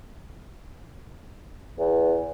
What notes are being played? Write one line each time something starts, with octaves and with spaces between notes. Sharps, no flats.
E2